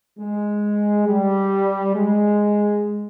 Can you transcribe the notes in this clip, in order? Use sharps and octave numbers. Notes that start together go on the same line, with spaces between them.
G#3
G3
G#3